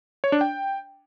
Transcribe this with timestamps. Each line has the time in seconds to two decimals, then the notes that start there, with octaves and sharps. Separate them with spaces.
0.24 C#5
0.32 D4
0.41 G5